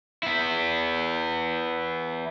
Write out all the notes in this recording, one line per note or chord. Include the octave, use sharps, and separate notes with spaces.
B3 E4